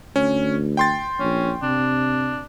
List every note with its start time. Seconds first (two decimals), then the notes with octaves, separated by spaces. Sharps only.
0.16 D2 C#4
0.77 G5 C6 A6
1.20 A#1 C#4
1.63 C3 D4